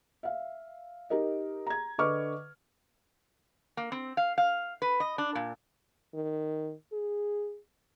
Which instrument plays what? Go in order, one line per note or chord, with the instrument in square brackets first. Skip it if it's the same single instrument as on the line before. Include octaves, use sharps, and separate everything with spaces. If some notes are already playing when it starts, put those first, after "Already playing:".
[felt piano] E5 F5
D#4 G4 A#4 D#5
A#5 G#6
D3 B4 D#5 C#6 D6 F6
[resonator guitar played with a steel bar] A#3
C4
F5
F5
B4
D#5
D4
A#2
[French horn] D#3
G#4